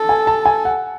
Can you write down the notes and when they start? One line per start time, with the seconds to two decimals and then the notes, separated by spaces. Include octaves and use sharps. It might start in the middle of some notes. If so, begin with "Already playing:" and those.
Already playing: A4
0.09 G#5
0.27 A5
0.46 G#5
0.65 F#5